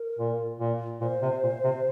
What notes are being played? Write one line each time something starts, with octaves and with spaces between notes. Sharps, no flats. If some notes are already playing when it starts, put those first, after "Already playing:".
Already playing: A#4
A#2
A#2
A#2 C5
C3
A#2
C3